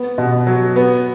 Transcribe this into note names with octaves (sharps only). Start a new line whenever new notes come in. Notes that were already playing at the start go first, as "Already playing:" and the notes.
Already playing: B3
B2
F#3
B3